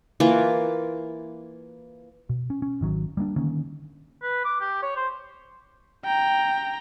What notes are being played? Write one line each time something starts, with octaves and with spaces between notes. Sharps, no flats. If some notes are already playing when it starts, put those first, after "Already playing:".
E3 A#3 F4
B2
C#4
C#4
G#1 D#3 F#3
G3 A#3 C4 D4
D3 D#3 A#3 C#4
B4
D6
G4
C#5
C5
G5 A#5